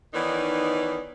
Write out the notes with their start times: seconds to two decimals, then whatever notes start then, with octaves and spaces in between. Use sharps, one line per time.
0.14 D#3 E3 B3 D#4 C#5 D5